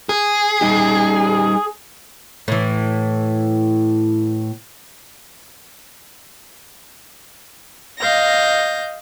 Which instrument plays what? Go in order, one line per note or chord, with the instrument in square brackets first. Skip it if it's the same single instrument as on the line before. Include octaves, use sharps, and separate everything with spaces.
[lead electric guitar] G#4
[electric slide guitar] G3 D#4 G4
[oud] A2 E3
[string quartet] D#5 F5 G6 A#6